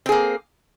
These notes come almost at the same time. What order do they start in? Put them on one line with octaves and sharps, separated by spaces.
C4 G#4 A#3